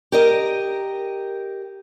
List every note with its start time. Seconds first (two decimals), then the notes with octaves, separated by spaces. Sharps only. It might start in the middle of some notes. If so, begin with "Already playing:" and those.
0.12 G4 A#4 D#5